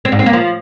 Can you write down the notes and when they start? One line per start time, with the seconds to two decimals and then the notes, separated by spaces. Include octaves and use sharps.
0.05 C4
0.12 G#2
0.19 C4
0.26 A#3
0.33 F3